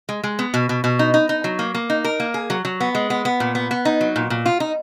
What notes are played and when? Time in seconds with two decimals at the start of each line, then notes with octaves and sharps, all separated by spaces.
0.09 G#3
0.24 G#3
0.39 B3
0.54 B2
0.69 B2
0.84 B2
0.99 D#4
1.14 D#4
1.29 D#4
1.44 F#3
1.59 A#3
1.74 A#3
1.90 D#4
2.04 A#4
2.20 A#3
2.34 G#4
2.50 F#3
2.65 F#3
2.80 B3
2.95 G#3
3.10 B3
3.25 B3
3.40 A#2
3.55 B3
3.71 B3
3.85 D#4
4.01 F#3
4.16 A#2
4.30 A#2
4.46 F4
4.60 D#4